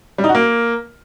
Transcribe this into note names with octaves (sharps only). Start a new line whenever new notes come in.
G3
D#4
F#4
A#3